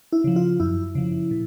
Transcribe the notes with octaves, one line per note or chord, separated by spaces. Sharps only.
E4
C#3 F3
F4
F#2 E4
C#3 F3
A#2